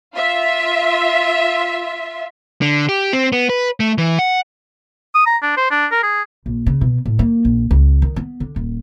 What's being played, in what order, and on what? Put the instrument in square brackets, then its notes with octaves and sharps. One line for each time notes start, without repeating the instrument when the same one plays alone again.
[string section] F4 E5
[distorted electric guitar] D3
G4
C4
B3
B4
A3
E3
F#5
[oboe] D#6
A#5
D4
C5
D4
A#4
G#4
[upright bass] A#1
C#3
B2
A2
A#3
A#1
C#2
D#3
B3
D3
D#1